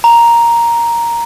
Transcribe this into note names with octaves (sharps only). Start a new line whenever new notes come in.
A#5